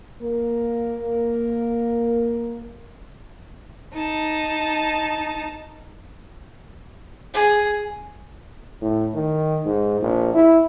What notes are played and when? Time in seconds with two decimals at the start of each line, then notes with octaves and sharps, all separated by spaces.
0.22 A#3 A#4
3.94 D#4 A5
7.34 G#4
8.81 A2
9.14 D#3
9.65 G#2
10.01 A#1
10.34 E4